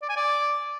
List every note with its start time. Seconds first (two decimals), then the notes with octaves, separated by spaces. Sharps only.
0.02 D5
0.09 G#5
0.17 D5